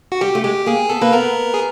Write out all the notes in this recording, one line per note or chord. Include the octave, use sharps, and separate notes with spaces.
F#4
G3 G4
A3
G#3 G4
A#3 G#4
B3 A4
A#3 B4
B3 A#4
G#4